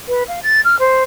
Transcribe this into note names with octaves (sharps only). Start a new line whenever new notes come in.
B4
F5
A6
F6
C5